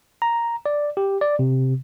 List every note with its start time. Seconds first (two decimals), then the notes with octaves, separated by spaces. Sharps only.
0.22 A#5
0.66 D5
0.97 G4
1.21 D5
1.39 C3